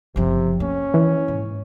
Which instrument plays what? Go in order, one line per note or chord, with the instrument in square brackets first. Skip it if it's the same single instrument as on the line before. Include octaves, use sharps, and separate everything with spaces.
[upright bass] F#1 F3 [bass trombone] C3
[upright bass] A#3 [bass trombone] C#4
[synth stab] E3
[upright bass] G#2